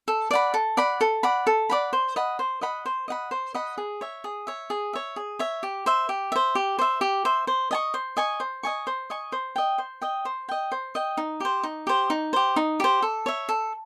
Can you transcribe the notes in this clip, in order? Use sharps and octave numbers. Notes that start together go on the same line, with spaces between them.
A4
D5 F#5 B5
A4
D5 F#5 B5
A4
D5 F#5 B5
A4
D5 F#5 B5
C5
D#5 F#5 B5
C5
D#5 F#5 B5
C5
D#5 F#5 B5
C5
D#5 F#5 B5
G#4
C#5 E5
G#4
C#5 E5
G#4
C#5 E5
G#4
C#5 E5
G4
C5 E5
G4
C5 E5
G4
C5 E5
G4
C5 E5
C5
D#5 G#5 C#6
C5
D#5 G#5 C#6
C5
D#5 G#5 C#6
C5
D#5 G#5 C#6
C5
D#5 G5
C5
D#5 G5
C5
D#5 G5
C5
D#5 G5
D#4
G4 C5
D#4
G4 C5
D#4
G4 C5
D#4
G4 C5
A4
C#5 E5
A4